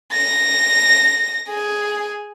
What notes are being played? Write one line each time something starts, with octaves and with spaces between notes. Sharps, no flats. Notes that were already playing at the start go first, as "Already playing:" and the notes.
A#6
G#4